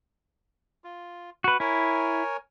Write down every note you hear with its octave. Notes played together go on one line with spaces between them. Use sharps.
F4
F#4 B4
E4 A#4 C#5 G#5